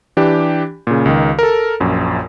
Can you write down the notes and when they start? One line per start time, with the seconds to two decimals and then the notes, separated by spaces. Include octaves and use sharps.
0.17 E3 D4 G4
0.87 A#2 C#3
1.06 C#2 D#3
1.39 A4 A#4
1.80 A#1 F#2